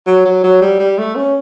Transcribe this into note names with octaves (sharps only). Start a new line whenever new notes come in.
F#3
F#3
F#3
G3
G3
A3
C#4